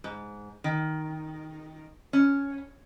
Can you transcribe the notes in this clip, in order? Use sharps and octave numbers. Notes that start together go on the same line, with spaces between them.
G#2
D#3
C#4